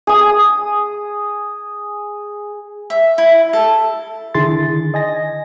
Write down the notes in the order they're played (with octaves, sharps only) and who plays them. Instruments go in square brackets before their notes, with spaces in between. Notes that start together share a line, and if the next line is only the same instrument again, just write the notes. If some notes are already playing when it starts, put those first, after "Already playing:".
[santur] G#4 D#6
[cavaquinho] E5
E4
A4
[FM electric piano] D3 D#3 E4 G#4 C6 A6
D#5 G#5 A#6